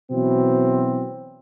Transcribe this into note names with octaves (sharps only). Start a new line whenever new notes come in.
B2 E3 F#3 C4